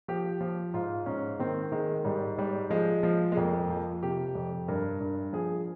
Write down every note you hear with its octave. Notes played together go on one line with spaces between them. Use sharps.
F3 G4
F3
G#2 F4
G#2 C#4
D#3 C4
D#3 G#3
G#2 G3
G#2 G3
F3 G#3
F3
G#3
F2 A#3
F3
C3 G4
F2
G2 A#4
G2
F3 G#4